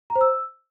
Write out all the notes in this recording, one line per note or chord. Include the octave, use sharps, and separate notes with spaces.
A#5
C5
E6